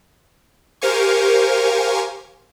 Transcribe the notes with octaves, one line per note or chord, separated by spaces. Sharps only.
G4 A#4 C5 F5 G#5 C#6